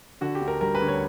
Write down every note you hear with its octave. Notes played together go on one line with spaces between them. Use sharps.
D3 F#4
G4
D2
A#4
G3 A#4
B4
D2
C#5